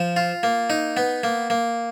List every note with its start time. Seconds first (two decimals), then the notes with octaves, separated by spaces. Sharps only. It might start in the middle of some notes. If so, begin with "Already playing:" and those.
Already playing: F3
0.17 F4
0.43 A#3
0.70 D#4
0.97 B3
1.24 A#3
1.50 A#3